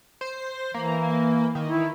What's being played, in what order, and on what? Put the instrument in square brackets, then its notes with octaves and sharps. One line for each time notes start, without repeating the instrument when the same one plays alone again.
[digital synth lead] C5
[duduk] E3 [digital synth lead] A#3
[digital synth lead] D#3
[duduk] E4